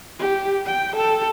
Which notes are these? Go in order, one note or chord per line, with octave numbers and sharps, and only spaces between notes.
G4
G5
A4